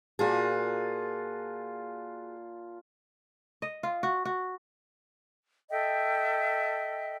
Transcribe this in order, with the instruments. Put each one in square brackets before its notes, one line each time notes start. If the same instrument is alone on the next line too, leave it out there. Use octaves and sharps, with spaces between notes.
[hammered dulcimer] A#2 F4 A5 [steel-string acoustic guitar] F#4 G#4
[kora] D#5
F4
F#4
F#4
[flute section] A4 D#5 E5 G5